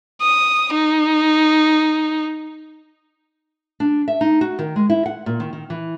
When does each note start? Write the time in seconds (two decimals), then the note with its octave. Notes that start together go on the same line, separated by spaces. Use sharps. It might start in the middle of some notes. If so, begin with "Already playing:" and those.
0.21 D#6
0.73 D#4
3.80 D4
4.08 E5
4.21 D#4
4.41 F#4
4.59 D#3
4.76 G#3
4.90 E4
5.06 F#5
5.26 A#2
5.40 D#3
5.53 D#3
5.70 E3